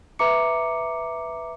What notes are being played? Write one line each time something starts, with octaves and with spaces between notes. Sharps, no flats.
B4 E5 A#5 D6 C#7